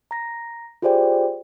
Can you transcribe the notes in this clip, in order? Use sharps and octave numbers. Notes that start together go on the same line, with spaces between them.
A#5 A#6
F4 G4 G#4 C5 D5 G5